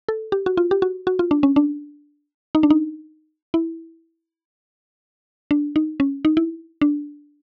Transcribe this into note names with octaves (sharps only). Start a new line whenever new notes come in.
A4
G4
F#4
F4
G4
F#4
F#4
F4
D4
C#4
D4
D#4
D4
D#4
E4
D4
D#4
C#4
D#4
E4
D4